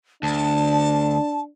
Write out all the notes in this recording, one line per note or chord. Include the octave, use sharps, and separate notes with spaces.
D2 D4 A5